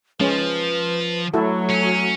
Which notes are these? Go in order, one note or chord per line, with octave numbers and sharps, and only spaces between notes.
F3 G#3 C#4 B4
F#3 A3 E4 F#4 A4
C#4